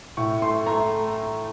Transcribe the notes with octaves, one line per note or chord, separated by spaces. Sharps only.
A2 C#6
A3 C6
A3 A#5